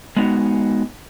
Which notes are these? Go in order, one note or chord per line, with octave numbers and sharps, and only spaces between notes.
G#3 B3 D#4 F#4